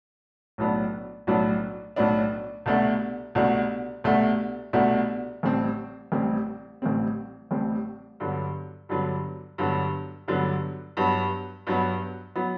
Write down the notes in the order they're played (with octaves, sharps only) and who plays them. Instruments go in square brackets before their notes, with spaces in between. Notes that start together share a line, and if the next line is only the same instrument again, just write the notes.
[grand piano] B1 A2 F#3 B3 D4
B1 A2 F#3 B3 D4
B1 A2 F#3 B3 D4
C2 B2 A3 D4 F#4
C2 B2 A3 D4 F#4
C2 B2 A3 D4 F#4
C2 B2 A3 D4 F#4
A1 A2 G3 C4
A1 A2 G3 C4
A1 A2 G3 C4
A1 A2 G3 C4
G2 D3 F#3 B3
G2 D3 F#3 B3
G2 D3 F#3 B3
G2 D3 F#3 B3
G2 F#3 B3
G2 F#3 B3
F#3 B3